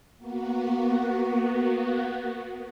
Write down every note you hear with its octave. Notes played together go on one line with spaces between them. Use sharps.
A#3 B3 F#4